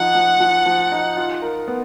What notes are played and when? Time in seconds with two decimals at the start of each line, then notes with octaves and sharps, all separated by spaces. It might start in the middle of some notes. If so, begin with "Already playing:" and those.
Already playing: F3 D#4 F#5
0.15 F3
0.40 F3
0.66 F3
0.92 D#4
1.17 F4
1.42 A#4
1.68 B3